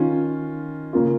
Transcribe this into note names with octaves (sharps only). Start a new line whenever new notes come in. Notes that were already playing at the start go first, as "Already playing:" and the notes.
Already playing: D#3 C#4 F4
C#3 A#3 C#4 F4